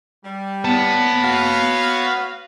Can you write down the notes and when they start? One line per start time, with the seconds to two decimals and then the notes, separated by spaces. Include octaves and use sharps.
0.25 G3
0.65 B3 C#5 A5
1.23 F#4 F5